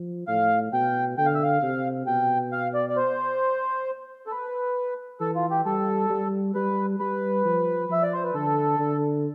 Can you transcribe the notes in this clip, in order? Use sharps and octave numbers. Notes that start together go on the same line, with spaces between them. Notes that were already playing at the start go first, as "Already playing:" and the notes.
Already playing: F3
A2 F5
B2 G5
D3 G5
F5
E5
F5
C3
B2 G5
F5
D5
D5
C5
A4
B4
E3 A4
F4
G4
G3 A4
G3
G3 B4
G3 B4
F3
F3 E5
D5
C5
B4
D3 A4
D3